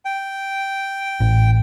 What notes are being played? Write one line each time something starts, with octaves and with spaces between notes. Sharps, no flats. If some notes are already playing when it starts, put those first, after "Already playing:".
G5
A1